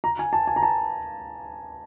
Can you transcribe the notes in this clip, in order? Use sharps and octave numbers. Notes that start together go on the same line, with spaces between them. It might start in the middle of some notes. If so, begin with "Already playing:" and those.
A#5
G#5
A5
G#5
A#5
A5